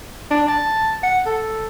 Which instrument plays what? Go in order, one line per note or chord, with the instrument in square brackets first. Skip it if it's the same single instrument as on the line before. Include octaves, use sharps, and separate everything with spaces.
[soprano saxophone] D4
A5
F#5
A4